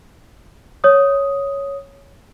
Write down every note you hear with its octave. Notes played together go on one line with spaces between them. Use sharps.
C#5 D#6